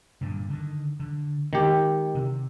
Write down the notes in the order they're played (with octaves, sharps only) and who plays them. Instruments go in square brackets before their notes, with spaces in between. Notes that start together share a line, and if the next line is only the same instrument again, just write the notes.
[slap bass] G2 A#2 D3
D3 D#3
D3
[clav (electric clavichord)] D#3 G4 [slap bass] G#3
[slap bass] C3